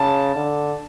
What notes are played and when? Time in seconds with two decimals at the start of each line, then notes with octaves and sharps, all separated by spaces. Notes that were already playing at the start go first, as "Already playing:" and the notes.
Already playing: C#3 A5
0.36 D3